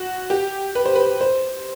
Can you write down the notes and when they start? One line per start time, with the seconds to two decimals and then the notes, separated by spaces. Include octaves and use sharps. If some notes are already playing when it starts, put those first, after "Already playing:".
Already playing: F#4
0.30 G4
0.75 B4
0.86 C5
0.96 B4
1.21 C5